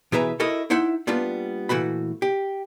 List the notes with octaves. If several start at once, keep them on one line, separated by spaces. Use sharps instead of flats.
B2 E3 G#4 B4 E5 A#5
E4 F#4 A4 A#4 D#5
D#4 E4 C5 E5 F#5
G3 A#3 B3 D4 F4
A#2 E3 A3 F#4 B5
G4